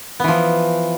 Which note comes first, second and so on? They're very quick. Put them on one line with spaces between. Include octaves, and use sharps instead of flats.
B3 E3 F3